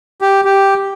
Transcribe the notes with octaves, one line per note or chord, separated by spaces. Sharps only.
G4
G4